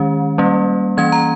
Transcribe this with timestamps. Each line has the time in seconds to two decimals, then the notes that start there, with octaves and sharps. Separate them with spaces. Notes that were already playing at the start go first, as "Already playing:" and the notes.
Already playing: D#3 G#3 C#4
0.38 G3 A#3 C#4
0.97 E3 A#3 C#4 G#6
1.12 A#5